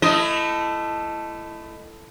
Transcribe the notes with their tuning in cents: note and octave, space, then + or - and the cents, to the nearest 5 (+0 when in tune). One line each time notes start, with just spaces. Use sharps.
A3 +0 E4 +25 D#5 +0